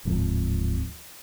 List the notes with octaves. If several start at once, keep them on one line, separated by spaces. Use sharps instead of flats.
D1 G#2 F3 C4